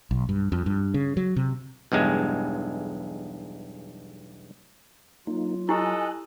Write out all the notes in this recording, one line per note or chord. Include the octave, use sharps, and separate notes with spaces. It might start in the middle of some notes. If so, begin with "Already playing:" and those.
B1
G2
F2
G2
C#3
F#3
C3
B1 E2 G2 G#3
F#3 A#3 D#4 F4
E4 G4 A4 D#5 G#5 F#6